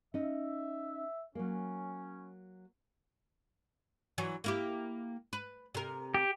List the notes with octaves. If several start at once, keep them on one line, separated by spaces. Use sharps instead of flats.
C#4 D#4 E5
F#3 A#3 C#4
E3 F#3
A#3 E4 G4
B4
C3 A#4
G4